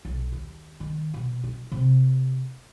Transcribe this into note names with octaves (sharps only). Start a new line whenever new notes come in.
B1
D#2
D#3
B2
D#4
C3